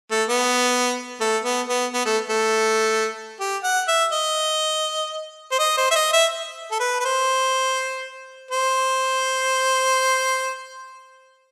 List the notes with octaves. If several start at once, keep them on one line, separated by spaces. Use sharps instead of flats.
A3
B3
A3
B3
B3
B3
A3
A3
G4
F#5
E5
D#5
C5
D#5
C5
E5
D#5
E5
A4
B4
B4
C5
C5